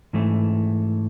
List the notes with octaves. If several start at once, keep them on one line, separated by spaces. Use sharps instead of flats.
G#2 E3 A3